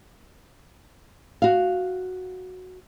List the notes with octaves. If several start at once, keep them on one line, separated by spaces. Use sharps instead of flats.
F#4 F5